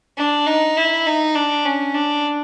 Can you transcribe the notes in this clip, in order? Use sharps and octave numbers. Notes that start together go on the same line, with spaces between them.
D4
D#4
E4
D#4
D4
C#4
D4